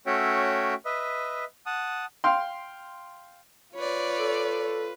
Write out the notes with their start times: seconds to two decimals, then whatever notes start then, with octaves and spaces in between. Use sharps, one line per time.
0.06 A3 C#4 F#4 C#5 E5 G5
0.85 B4 D#5 E5
1.66 F#5 A5 D#6
2.24 F5 G5 C6
3.75 F4 B4 C#5 D5
4.19 A4